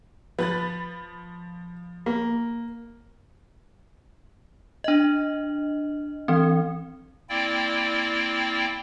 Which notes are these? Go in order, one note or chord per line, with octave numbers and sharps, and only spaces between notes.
F3 B4 B5 A6
A#3
D4 D#5
E3 C4
A#3 C4 E4 D5 G5